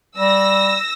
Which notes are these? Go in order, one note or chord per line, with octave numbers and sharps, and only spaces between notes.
G3 E6 A#6